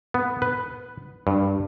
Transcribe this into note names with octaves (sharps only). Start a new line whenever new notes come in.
B3
B4
G2